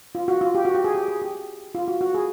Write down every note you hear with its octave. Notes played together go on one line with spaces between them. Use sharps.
F4
F#4
F4
G4
F#4
G4
G#4
G4
G#4
G4
F4
F#4
F#4
G#4